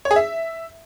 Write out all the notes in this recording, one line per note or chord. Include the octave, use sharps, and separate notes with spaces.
C#5
G#4
E5